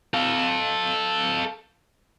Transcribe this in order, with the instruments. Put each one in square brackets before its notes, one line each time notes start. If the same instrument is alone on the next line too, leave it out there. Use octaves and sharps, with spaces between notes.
[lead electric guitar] A4 F5